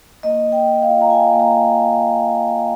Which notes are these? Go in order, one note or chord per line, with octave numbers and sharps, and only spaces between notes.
A#3 D#5
A#3
G5
A#3
F5
F4
A#5
F4 G#5
A#3
A#5